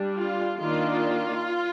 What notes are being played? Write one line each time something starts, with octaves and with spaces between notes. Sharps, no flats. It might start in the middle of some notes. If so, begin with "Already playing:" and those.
Already playing: G3 D4
F4
D#3 A#3 D4 F4